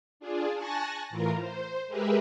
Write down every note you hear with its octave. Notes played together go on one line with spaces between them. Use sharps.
D4 F4 G#4
G#5 A5 C#6 F#6 A6 A#6
A2 E3 F4 A#4 A#5
C5
G#3 G4 G#4 A#4 B4 E5